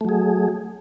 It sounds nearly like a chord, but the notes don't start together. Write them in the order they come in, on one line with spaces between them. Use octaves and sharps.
A3 F#3 G#4